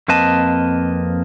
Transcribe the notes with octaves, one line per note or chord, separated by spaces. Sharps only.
F2 A#3 C4 B4 D#5 A5